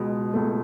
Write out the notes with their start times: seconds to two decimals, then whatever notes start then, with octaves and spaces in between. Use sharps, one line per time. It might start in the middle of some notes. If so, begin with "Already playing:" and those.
Already playing: C#2 B2 G#3 B3
0.34 C#2 B2 A3